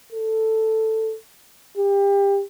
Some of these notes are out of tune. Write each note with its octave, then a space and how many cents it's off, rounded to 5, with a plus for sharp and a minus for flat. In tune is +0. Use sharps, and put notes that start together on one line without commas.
A4 +5
G4 +25